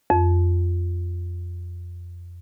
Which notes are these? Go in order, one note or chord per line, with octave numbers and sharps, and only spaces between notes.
F2